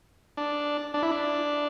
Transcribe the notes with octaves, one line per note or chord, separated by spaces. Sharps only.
D4
D4
E4
D4